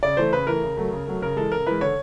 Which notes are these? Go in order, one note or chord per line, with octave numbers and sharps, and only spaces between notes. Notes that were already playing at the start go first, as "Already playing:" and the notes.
C#3 D5
E3 A3 C5
C#3 B4
E3 A3 A#4
C#3
F#3 A3
C#3
F#3 A3
C#3 A#4
E3 G#3 A4
C#3 A#4
E3 G#3 B4
D3 C#5